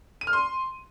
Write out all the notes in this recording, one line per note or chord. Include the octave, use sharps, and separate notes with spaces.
D#7
F6
C6